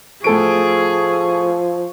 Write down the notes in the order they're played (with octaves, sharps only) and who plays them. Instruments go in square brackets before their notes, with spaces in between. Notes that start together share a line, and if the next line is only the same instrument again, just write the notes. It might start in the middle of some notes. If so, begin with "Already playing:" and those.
[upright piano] A2 A4 D7 [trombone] F3 [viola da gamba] G#4 [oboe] C#6